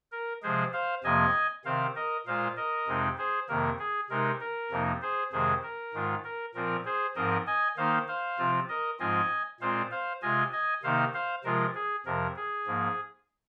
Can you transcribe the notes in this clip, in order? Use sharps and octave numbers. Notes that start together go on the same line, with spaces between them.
A#4
C3 F3 G#3 G#4 C5
C5 F5
F2 C3 F3 A#3 D#5 G#5
C3 D#3 C4 C5 F5
A#4 D#5
A#2 G#3 F4 C5 F5
A#4 D#5
F2 C3 G#3 C4 D#4
G#4 C5
F2 C3 D#3 A#3 A#4
G#4
C3 G#3 D#4 A#4
A#4
F2 C3 F3 A#3 D#4
G#4 C5
F2 C3 D#3 G#3 G#4 C5
A#4
G#2 D#3 G#3 F4
A#4
A#2 F3 C4 F4 A#4
G#4 C5
G#2 F3 C4 A#4 D#5
D#5 G#5
D#3 A#3 D#4 C5 F5
C5 F5
C3 F3 C4 F4
A#4 D#5
G#2 F3 G#3 C4 F4 D#5 G#5
A#2 G#3 C4 F4 C5 F5
C5 F5
C3 G#3 F4 D#5 G#5
D#5 G#5
C3 D#3 A#3 D#4 C5 F5
C5 F5
C3 F3 G#3 F4 A#4
G#4
F2 C3 F3 A#4
G#4
G#2 F3 A#3